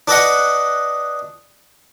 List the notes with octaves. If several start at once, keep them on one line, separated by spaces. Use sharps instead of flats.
D4 B4 D#5 F#5